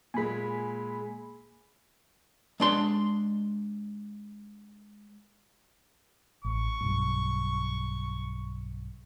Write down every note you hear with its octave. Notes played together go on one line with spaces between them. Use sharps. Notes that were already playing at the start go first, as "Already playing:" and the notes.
A#2 G#3 G#5 B5
G#3 D4 C6
A1 C#6
B1 G2